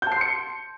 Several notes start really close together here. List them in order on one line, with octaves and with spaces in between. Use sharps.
G6 A5 C7 C6 C#7